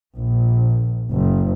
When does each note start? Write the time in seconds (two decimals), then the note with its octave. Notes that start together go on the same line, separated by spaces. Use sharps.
0.16 A#1
1.11 F#1